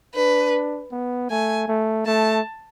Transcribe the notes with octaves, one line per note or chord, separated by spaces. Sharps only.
D4 B4
B3
A3 G#5
A3
A3 A5